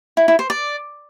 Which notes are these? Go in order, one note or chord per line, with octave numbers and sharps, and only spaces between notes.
E4
E4
C5
D5